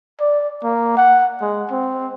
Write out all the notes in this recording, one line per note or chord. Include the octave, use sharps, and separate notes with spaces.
D5
A#3
F#5
G#3
C4